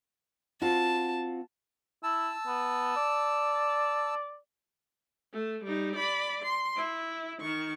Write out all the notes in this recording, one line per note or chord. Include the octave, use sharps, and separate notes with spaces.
C4 F4 F#4 A5
E4 A5 E6
B3
D5
A3
G3 D#4
D5 B5
C6
E4
D#3 C#6